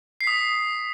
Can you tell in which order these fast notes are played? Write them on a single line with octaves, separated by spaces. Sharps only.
C7 B6 D#6